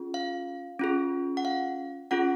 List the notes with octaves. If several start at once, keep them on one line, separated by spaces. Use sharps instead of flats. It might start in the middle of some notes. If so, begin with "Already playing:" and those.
Already playing: C#4 F4 G#4
F5
C#4 F4 G#4
F#5
F5
C#4 F4 G#4 F#5